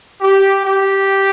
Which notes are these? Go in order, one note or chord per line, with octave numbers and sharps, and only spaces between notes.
G4
G4